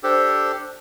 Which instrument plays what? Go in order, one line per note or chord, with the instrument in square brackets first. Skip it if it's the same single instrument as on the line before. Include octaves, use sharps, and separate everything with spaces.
[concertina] D4 G4 A4 [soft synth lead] C5